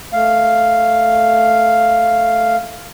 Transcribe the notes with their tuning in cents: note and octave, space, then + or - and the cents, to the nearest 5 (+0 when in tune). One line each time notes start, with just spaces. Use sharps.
A3 +0 F5 +0